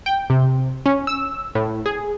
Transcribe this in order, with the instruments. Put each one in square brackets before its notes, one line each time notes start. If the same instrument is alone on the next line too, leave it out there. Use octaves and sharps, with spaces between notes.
[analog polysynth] G5
C3
C#4
E6
A2
G#4